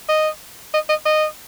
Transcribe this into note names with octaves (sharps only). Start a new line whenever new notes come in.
D#5
D#5
D#5
D#5